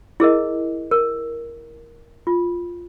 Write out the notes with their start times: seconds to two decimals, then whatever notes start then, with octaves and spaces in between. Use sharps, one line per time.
0.20 E4 G#4 A#4 D#5
0.91 A#4
2.27 F4